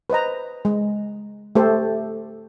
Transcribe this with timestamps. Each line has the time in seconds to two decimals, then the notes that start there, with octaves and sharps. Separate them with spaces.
0.10 B4 C5 D#5 A#5
0.65 G#3
1.55 A3 G4 A4 C5